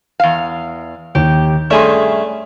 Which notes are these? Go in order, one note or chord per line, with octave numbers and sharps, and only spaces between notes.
E2 F5
D#2 G4
G2 A3 C#4 G#4 D5 E5 G#5 C6